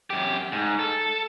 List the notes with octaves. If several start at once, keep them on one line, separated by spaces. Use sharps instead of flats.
F#2 G4
G#2
A4